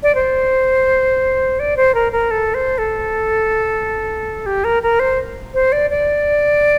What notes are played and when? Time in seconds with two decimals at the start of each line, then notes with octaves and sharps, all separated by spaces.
0.03 D5
0.15 C5
1.60 D5
1.77 C5
1.95 A#4
2.12 A#4
2.31 A4
2.54 C5
2.78 A4
4.46 G4
4.64 A#4
4.83 A#4
5.00 C5
5.54 C5
5.72 D5
5.90 D5